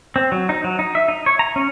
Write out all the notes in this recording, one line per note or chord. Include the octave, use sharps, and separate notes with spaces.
C4
F#3
D#4
F#3
D#4
E5
D#4
C#5
A#5
C#4